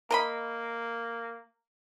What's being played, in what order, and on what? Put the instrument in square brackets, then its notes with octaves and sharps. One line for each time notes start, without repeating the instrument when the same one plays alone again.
[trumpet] A#3 [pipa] A#4 D#5 B5